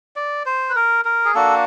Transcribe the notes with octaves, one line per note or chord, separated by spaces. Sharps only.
D5
C5
B4
A#4
A#4
G#4
A#3 D4 F#4 A4